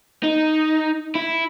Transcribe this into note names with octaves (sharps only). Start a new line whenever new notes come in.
D#4
E4